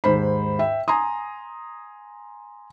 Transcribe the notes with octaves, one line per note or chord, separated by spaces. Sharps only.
D#2 G#2 C5 B5
E5 G5
G#5 A#5 C6 D#6